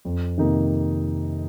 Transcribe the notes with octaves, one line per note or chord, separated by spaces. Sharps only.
F2
C3 D#3 A#3 D#4